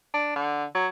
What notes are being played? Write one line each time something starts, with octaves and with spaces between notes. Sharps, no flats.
D4
D3
F#3